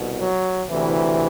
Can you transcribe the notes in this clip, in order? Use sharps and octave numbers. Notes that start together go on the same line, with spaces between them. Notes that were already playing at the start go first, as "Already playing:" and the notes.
Already playing: C2 B2
F#3
D2 C3 E3